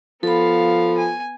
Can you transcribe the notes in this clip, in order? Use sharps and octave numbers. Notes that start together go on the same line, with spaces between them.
F3 B3 A4 F5 B5
G#5